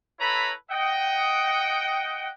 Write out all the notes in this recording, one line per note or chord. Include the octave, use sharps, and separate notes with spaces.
E4 A4 B4 C#5 A#5 B5
D#5 F#5 G5